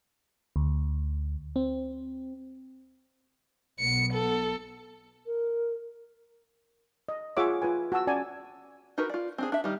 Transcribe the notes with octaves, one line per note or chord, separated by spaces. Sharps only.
D2
C4
B1 B3 C#7
A4
A#4
D#5
F4 G#4 C#5 E5 F#5 D6
F4 B4 G#5
F#4 A5 E6
C#4 D5 G#5 A5
D#4 F#4 A#4 B4
F4 D5
C4 D4 G#4
D4 E5
D#3 G3